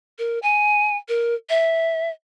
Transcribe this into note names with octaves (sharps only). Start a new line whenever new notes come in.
A#4
G#5
A#4
E5